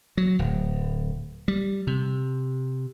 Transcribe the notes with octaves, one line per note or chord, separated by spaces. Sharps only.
F#3
D1
G3
C3